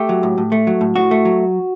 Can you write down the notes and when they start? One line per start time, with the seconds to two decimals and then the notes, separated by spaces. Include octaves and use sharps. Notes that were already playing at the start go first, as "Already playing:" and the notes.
Already playing: A3 G4
0.09 F#3
0.23 A2
0.38 A2
0.52 A3
0.67 F#3
0.81 A2
0.96 A2 F#4
1.11 A3
1.25 F#3